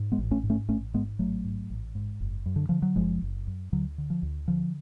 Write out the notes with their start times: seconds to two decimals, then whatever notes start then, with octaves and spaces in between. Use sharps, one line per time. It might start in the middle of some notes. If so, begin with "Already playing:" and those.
Already playing: G#2
0.12 G#3 B3
0.18 A1
0.31 A3 C#4
0.44 G#2
0.50 A3 C#4
0.69 A1 A3 C#4
0.94 G#2 G#3 B3
1.19 A1 F#3 A3
1.45 G#2
1.70 A1
1.95 G#2
2.20 F#1
2.46 F#2
2.56 D3
2.69 D3 F3
2.82 F#3
2.96 F#1 F3 G#3
3.22 F#1
3.47 F#2
3.72 D2 D3 F#3
3.98 D3
4.10 F3
4.22 D2
4.48 D3 F3